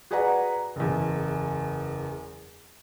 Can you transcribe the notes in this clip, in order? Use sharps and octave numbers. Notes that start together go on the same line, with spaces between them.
F#4 G#4 B4 D5 F#5 A#5
F#1 E2